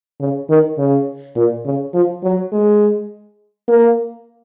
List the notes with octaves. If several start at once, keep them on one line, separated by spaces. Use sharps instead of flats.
C#3
D#3
C#3
A#2
C#3
F3
F#3
G#3
A#3